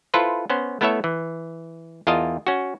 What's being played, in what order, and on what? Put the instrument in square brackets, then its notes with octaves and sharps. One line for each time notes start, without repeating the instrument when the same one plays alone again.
[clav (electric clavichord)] E4 F4 A4 B4 C5
B3 C#4 C5
A3 B3 E4 A4 C#5 E5
E3
E2 F4 A#4 D#5 A5
C#4 F#4